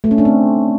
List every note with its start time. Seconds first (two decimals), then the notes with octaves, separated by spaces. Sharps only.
0.04 A3
0.11 C#4
0.18 D4
0.25 C4